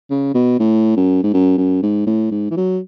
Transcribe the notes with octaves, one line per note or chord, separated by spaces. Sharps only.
C#3
B2
A2
F#2
G#2
F#2
F#2
G#2
A2
G#2
E3
F#3